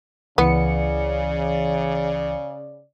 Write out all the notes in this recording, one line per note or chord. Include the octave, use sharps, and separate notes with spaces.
C#2 C#3 E3 B3 D5 C#7